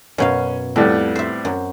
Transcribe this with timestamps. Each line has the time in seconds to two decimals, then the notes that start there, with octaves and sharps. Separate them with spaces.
0.18 F#2 B2 C#4 F5
0.76 F2 A2 G3 B3
1.16 C5 E5
1.45 F#2